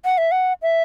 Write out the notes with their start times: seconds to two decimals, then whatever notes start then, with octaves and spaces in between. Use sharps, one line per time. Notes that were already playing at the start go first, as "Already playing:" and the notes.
0.05 F#5
0.18 E5
0.32 F#5
0.62 E5